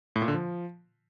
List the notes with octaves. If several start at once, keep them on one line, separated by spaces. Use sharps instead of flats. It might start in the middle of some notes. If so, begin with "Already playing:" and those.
A2
A#2
D3
F3